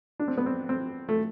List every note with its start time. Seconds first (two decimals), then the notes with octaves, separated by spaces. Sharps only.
0.20 D4
0.28 C4
0.37 B3
0.46 C4
0.69 C4
1.09 A3